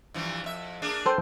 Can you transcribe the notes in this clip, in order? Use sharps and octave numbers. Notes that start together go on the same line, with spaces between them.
G2 E3 F3
F2 E5
A#3 D4 G#4
A4 C5 G5